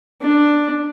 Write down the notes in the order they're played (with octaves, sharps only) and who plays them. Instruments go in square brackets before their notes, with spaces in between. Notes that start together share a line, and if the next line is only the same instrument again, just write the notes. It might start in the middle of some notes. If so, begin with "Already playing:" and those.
[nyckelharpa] D4